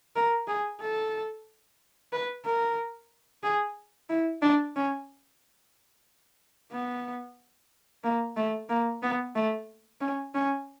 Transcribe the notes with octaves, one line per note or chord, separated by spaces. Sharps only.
A#4
G#4
A4
B4
A#4
G#4
E4
D4
C#4
B3
A#3
A3
A#3
B3
A3
C#4
C#4